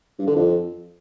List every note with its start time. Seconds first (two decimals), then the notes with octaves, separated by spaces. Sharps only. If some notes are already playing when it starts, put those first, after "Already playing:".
0.19 G2
0.27 D3
0.35 F2